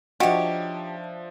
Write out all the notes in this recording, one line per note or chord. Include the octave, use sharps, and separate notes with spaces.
F3 D4 D#4 F#4 G4 C#5 E5